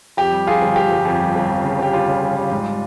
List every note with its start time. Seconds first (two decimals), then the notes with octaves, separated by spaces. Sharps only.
0.17 F2 G4
0.32 G3
0.47 F2 F4 G#4
0.61 G1
0.76 G1 G4
0.91 G1
1.05 F2
1.20 G3
1.35 G1
1.49 F2
1.64 C#3
1.79 G1 G4
1.93 G3 F4
2.07 C#3
2.22 G1
2.36 G3
2.51 G#2
2.66 G3